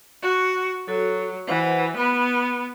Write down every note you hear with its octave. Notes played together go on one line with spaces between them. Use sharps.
F#4
F#3 F#4 A4
E3 B4 C5 F#5
B3 B5